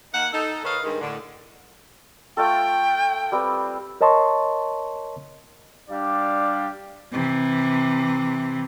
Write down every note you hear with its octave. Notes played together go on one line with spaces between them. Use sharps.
D#3 A#3 D#4 F#5
D#4 A4
D#3 A4 B4 C#5 D#5 F5
G2 D#3 G#3
A2 D3
A3 F4 A4 G5
G3 C4 B4
A#4 C#5 D#5 A5 C6 C#6
G3 D4 G4 D5 F5
C3 E3